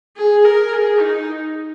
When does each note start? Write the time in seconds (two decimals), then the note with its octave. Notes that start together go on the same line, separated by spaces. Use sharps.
0.17 G#4
0.45 A#4
0.73 G#4
1.01 D#4